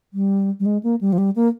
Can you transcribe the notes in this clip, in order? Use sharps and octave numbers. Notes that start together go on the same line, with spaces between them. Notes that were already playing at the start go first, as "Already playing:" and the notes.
G3
G3
G#3
A#3
G3
F3
G3
A#3